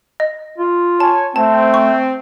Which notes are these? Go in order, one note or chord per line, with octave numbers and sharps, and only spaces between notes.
D#5
F4
C#5 G#5 A5
A3 C4 A5
C#6